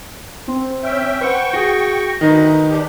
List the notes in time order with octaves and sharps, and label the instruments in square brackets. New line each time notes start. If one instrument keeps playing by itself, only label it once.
[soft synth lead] C4
[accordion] C#4 E5 G5
[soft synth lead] B4 [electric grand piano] C5 F#5 [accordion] G5 C#6
[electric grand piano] F#4 G#4 [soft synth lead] A#6
[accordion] D2 [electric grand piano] D#3 D#4 B4
[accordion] D4 G4